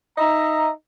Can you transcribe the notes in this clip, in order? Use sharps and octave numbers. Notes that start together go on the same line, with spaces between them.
D#4 D#5 E5 A#5